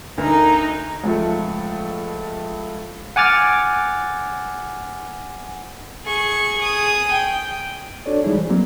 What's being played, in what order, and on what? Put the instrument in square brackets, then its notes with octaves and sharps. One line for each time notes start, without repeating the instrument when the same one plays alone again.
[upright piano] D2 A#4 F7 [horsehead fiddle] D#4 A#5
[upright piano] C#2 F3 A3
[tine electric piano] F#5 G#5 D6 F6 A6
[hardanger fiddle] G#4 C#6
G#4 D#6
G5
[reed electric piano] D4 F#4 A4 C#5 D5
E3 G3 G#3 D#4 E4 G#4
E4 C5
F#3 A#3 C4